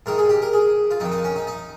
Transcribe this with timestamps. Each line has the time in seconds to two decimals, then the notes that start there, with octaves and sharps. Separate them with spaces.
0.06 G#2 D#3 A#4
0.18 G#4
0.29 G4
0.42 A#4
0.54 G#4
0.91 F4
1.00 F2 D#3 D#4
1.12 D#4
1.24 C#4
1.36 D#4
1.47 D#4